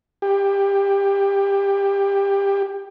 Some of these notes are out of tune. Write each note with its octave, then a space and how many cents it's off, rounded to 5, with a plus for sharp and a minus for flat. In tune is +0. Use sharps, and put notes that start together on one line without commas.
G4 +20